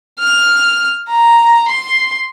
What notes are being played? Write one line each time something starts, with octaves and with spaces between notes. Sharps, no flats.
F6
A#5
C6